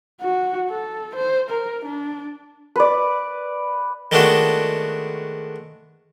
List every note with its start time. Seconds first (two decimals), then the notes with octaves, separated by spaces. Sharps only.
0.21 F#4
0.69 A4
1.15 C5
1.50 A#4
1.85 D4
2.76 B4 D5
4.12 D#3 G#3 A3 B3 D4 F#4